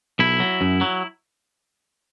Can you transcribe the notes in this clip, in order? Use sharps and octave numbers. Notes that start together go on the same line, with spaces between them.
B1 E4
F#3
F#2
F#3